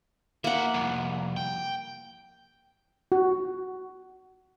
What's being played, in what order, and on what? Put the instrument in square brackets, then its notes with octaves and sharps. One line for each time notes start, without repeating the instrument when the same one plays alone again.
[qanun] A#3 F#5 [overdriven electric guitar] D#4 E5
[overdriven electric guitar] C2 F2
G5
[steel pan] F#4